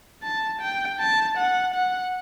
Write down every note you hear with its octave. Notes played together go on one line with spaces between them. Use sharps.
A5
G5
A5
F#5
F#5